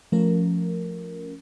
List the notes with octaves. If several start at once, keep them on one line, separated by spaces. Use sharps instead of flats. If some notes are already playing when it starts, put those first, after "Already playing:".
F3 A3 C#4 A#4